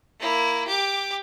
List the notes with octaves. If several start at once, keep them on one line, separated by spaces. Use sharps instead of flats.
A#3 E4
G4 D6